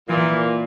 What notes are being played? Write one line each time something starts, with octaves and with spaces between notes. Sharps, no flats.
A#2 E3